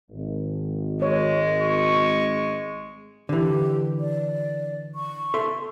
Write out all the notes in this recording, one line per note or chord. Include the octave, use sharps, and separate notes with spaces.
G#1
G#3 C#5
C#6
D3 E3 G4
D5
C#6
A4 E5 C6